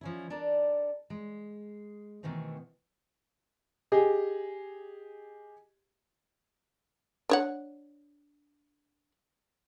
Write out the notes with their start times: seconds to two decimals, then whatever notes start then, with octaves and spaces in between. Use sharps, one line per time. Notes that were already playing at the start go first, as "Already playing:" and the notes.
0.01 F3 C#4 E4
0.30 D4 A4 A#4 D5
1.10 G#3
2.23 B2 D#3 E3 A3 C4
3.92 G4 G#4 D#5
7.29 D4 C#5 F#5